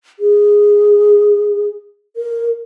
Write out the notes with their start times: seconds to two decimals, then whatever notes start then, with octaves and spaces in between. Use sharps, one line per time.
0.19 G#4
2.16 A#4